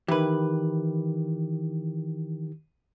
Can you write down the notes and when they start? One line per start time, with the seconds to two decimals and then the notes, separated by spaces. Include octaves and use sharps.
0.08 D#3 E3 G4 B4